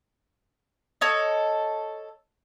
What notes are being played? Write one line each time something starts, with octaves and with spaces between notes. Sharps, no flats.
A4 C#5 D#5